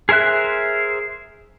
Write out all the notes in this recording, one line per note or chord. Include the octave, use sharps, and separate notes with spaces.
G#4 A#4 C5 E5 F#6